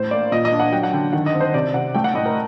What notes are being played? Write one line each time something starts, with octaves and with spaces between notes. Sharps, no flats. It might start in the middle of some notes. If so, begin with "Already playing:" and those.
Already playing: A2 C5
A#3 D5
A#2 D#5
D#5
D4
F#5
F#3 G5
F#5
D3 G5
D#3 F#5
D#5
C4
C5
C3 D5
C3 F#5
A3 G5
F#5
A2 D#5
A#4